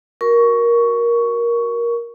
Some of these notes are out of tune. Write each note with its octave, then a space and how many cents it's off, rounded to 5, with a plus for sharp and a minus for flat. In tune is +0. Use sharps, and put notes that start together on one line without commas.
F#4 +0 A#4 +10 C#6 +10